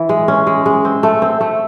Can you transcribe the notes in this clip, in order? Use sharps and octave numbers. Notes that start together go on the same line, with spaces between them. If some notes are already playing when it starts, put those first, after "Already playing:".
Already playing: E3
G#3
C#4
G#3
G#3
C4
A3
C4
A3